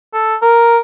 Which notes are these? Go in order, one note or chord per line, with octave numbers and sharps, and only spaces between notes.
A4
A#4